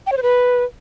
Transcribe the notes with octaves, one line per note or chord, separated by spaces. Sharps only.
G5
C#5
C5
B4